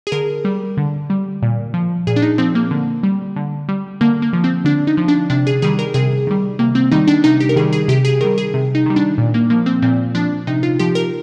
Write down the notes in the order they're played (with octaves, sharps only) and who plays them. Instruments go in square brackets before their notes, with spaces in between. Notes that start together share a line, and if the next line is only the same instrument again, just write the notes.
[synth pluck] G#4
D3 A#4
G3
D3
G3
A#2
F3
A#2 G#4
D4
D#4
F3 C4
A#3
D3
G3
D3
G3
D3 A#3
A#3
F3
C4
D3 D4
D#4
F3
D4
C3 D4
G#4
D#3 G3 G#4
A#4
C3 G#4
D#3 G3
C3 A#3
C4
D#3 G3 D#4
D4
C3 D#4
G4
A#4
D#3 G#4
G3
G#4
C3 G4
G#4
D#3 G3 A#4
G#4
C3
D#4
D#3 G3
D4
A#2
A#3
F3 A#3
C4
A#2 C4
F3 D4
C3 D#4
F4
F3 G4
A#4